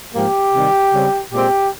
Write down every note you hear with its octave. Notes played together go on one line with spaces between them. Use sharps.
G#2 F3 A#3 G4
C3 D#3 G3
C#3 G3 C4
A#2 G#3 C4 G4